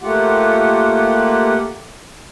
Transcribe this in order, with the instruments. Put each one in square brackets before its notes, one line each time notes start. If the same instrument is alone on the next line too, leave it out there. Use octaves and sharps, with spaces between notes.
[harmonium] A3 A#3 F4 G4 F#5